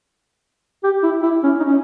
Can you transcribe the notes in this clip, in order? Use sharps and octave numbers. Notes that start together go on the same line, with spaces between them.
G4
E4
E4
C#4
D#4
C#4